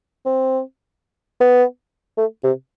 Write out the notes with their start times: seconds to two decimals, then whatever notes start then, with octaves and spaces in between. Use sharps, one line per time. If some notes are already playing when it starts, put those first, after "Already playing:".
0.26 C4
1.40 B3
2.17 A3
2.44 C3